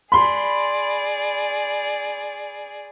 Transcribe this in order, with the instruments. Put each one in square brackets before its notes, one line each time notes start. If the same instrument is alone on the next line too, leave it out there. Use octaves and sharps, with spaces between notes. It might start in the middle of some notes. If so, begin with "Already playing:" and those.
[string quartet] G#4 D5 [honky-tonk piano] B5 C6